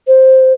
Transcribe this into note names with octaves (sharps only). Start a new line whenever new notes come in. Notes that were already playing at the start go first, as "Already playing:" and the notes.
C5